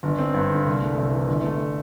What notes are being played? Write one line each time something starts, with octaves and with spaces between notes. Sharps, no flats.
G1
C4
G2
D3
C2
A3
C3
E3
G1
A3